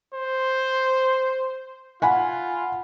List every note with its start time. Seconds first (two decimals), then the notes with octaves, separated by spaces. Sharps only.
0.14 C5
2.02 F4 F#5 G#5 B5